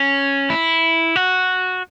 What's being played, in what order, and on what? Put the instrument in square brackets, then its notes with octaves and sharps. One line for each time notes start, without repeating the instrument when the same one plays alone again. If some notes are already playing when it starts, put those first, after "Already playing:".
Already playing: [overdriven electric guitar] C#4
E4
F#4